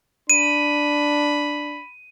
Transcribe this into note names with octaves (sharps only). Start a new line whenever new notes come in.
D4 B5 D#7